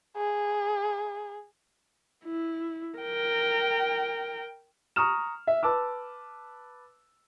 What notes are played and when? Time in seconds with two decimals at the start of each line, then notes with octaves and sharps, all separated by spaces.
0.17 G#4
2.25 E4
2.98 A#4 G5
4.96 A#5 C#6 D#6 F6 E7
5.47 E5
5.63 B4 A5 D6 E6